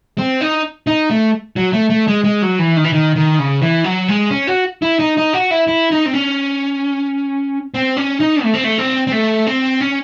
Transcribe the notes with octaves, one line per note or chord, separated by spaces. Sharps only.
C4
D#4
D#4
A3
F#3
A3
A3
G#3
G#3
F#3
E3
D#3
E3
D#3
D#3
C#3
E3
F#3
G#3
C#4
F#4
E4
D#4
D#4
F#4
E4
E4
D#4
C4
C#4
C4
C#4
D#4
A3
C4
A3
C4
C4
A3
C4
C#4